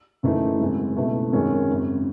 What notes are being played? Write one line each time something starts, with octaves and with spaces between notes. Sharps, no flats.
F#1 F#2 E3 A3 D#4
G#1 F#2 C#3 G#3
C#2 B2 A3 E4
G#1 F#2 D#3 G#3 C#4
G#1 F#2 C#3